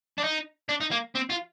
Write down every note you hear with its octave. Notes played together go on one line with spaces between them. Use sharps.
D4
D#4
D4
D#4
A#3
C4
F4